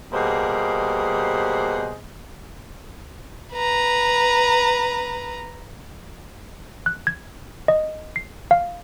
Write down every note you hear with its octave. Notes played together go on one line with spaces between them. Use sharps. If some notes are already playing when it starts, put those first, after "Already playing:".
B2 G3 A#3 G#4 C5 D#5
B4 A#5
F#6
G#6
D#5
C7
F5